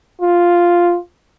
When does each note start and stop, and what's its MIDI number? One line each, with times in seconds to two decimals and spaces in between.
0.21 0.96 65